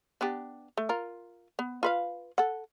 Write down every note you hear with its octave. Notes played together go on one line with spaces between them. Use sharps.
B3 D4 G4
A3
F4 A#4
B3
F4 B4 F5
A4 F#5